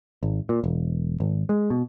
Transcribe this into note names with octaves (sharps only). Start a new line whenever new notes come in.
G#1
A#2
E1
G#1
G#3
B2